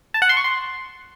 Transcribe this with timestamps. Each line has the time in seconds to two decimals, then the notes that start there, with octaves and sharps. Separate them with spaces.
0.14 A5
0.22 F#5
0.29 C6
0.37 C#6
0.44 C6